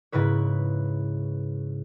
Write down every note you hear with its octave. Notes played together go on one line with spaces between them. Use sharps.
G#2 C#3 E4 B4 C#5